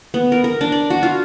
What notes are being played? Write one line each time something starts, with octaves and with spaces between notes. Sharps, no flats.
B3
A#4
A#4
D4
D5
F#4
F4